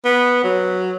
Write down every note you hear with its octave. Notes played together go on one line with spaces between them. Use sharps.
B3
F#3